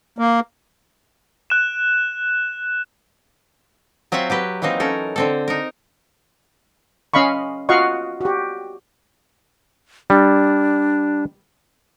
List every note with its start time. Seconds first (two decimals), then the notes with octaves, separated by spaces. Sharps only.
0.18 A#3
1.50 F#6 E7
4.12 F#3 C4 F4 E5 F#5
4.30 F#3 G4 B4
4.62 E3 F#3 A#3 C4 D#4
4.80 C#4 A4 A#4
5.16 D3 C4 A4
5.48 D#4 A#4
7.14 C#4 D#5 F5 B5 C#6
7.69 F4 F#4 D#5 F5 F#5 C#6
8.21 F#4 G4
10.10 G3 D4